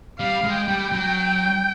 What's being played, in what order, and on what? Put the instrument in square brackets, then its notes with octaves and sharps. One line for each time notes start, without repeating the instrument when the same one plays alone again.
[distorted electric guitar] G3 [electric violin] F5
[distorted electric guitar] G#3
[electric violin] G5
[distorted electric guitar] G3
F#3